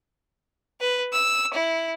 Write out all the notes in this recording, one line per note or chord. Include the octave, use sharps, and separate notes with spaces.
B4
E6
E4